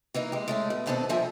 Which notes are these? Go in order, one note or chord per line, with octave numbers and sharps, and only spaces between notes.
E3 A#3 D#4 A#4
G#3 G4
G#3 A3 C#4
B2
D#2 B2 C4 D4 G4 A4
G2 A#2 F3 A#4 E5 G#5